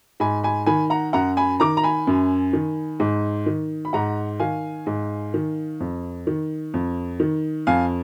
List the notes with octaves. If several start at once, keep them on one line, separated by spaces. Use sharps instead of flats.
G#2 G#5 B5
G#5 B5
D#3 G#5 B5
F#5 A#5
F#2 F#5 A#5
G#5 B5
D#3 A#5 D6
A#5
G#5 B5
F#2
D#3
G#2
D#3
B5
G#2 F#5 A#5
D#3 F5 G#5
G#2
D#3
F2
D#3
F2
D#3
F2 F5 G#5